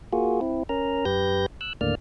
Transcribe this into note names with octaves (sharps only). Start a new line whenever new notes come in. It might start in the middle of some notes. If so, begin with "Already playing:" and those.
A#3 F4 F#4 G#4
C4 E4
C#4 A#4 A#5
F#2 G4 B4 G6 A#6
E6 F#6
D#2 A2 D3 A#3 D5 F6